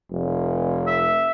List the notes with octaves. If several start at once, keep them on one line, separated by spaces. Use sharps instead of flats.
F1
E5